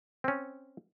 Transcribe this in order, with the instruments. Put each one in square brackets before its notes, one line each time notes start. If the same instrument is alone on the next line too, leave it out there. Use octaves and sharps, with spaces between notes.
[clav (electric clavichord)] C4 C#4